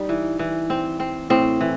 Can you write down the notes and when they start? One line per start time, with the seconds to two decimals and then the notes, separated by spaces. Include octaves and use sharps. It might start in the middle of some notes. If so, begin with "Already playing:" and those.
Already playing: G3 D#4
0.09 E3
0.39 E3
0.70 C4
1.00 C4
1.30 A2 C4
1.61 E3